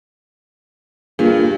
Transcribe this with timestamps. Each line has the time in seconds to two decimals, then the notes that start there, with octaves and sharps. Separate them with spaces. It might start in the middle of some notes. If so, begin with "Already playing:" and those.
1.19 G2 A#3 F4 G#4